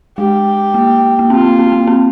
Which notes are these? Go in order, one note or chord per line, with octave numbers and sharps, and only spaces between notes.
G#3 G4
A#3
A#3
C4 F4
A#3
C4
A#3
C4